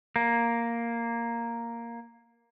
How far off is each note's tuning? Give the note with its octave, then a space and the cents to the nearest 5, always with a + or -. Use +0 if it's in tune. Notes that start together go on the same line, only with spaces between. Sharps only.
A#3 +0